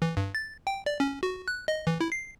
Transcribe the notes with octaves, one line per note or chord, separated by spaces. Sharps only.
E3
G2
A6
G5
D5
C#4
F#4
F#6
D#5
E3
E4
C7